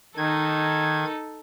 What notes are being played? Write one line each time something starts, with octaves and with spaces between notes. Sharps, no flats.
D#3 D#4 A4 G#6